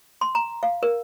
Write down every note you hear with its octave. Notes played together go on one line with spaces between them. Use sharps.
C6
A#5
F5
A#4